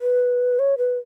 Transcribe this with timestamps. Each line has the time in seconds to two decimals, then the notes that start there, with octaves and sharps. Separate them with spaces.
0.01 B4
0.59 C#5
0.78 B4